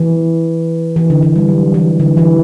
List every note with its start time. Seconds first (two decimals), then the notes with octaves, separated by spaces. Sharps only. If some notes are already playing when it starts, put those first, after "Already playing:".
Already playing: E3
0.96 E3
1.10 D3
1.23 E3
1.36 G3
1.48 F#3
1.74 E3
2.00 D3
2.17 E3